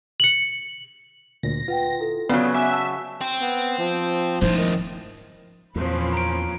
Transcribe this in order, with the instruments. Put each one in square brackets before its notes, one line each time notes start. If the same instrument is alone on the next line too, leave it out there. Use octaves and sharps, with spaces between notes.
[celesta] C#7 F#7
[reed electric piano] D2 A#2 [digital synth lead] A#6
[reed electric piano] F4 [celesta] B4 F#5 G5
[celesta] E4 A4
[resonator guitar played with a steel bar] C#3 F#3 [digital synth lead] B3 [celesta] D5
[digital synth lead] E5 [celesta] G#5 F#6 [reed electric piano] D6
[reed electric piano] A5 [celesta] E6
[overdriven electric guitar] C4
[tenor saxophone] B3
F3
[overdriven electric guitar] C#2 A2 [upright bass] F3 D#4 [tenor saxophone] C5
[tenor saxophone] D#3
[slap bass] E2 [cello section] A#2 C4 [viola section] F3 C#4 B4
[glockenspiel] A#5 D7